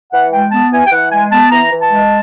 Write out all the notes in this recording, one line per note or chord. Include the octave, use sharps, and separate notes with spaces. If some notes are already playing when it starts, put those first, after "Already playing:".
E3 F#5
G#3 G5
B3 A5
E3 G#5
G5
E3 F#5
G#3 G#5
B3 A5
E3 A#5
E3
A5
G#3